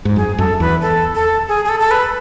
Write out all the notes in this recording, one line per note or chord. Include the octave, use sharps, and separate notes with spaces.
G#2
F#2 G#4
F#2 A4
E2 B4
A4
A4
G#4
G#4
A4
A4
B4